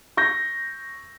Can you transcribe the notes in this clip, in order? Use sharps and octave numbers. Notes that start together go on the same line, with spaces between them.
C#6 G6 A#6